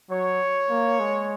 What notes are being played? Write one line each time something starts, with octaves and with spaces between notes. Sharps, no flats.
F#3 C#5
A#3
G#3